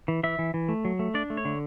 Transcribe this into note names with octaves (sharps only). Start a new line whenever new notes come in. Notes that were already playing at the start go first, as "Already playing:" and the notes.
E3
E3 E5
E3
E3
A3
F#3
A3
D4 D5
A3
C#5
D3